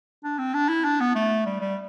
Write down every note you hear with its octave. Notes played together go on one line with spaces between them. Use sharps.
D4
C4
D4
E4
D4
B3
A3
G3
G3